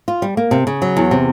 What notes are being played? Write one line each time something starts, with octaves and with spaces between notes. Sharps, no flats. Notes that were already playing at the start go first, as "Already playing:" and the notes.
F4
G3
A#3
C3
C#3
F#3
E2
C3